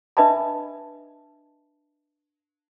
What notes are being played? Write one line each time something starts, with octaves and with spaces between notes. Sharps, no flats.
D4 B4 D#5 E5 A5 B5